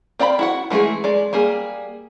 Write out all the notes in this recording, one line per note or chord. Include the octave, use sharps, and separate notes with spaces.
C4 D5 G5 A#5 B5
E4 F#4 F#5
E3 G#3 A3 E4 G#4
G#3 D5
G3 A#3 G#4